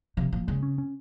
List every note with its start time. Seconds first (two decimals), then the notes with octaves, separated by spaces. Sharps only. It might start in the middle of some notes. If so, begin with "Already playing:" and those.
0.17 C3 F3
0.32 A#2 F3
0.48 C#3 G#3
0.63 C#4
0.78 C#4